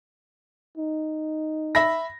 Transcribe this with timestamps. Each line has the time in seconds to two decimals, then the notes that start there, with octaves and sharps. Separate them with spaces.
0.77 D#4
1.75 E5 B5 A#6